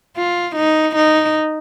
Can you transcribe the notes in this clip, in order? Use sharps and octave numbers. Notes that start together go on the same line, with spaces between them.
F4
D#4
D#4